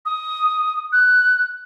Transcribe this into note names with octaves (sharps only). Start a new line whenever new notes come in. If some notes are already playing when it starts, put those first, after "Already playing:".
D#6
F#6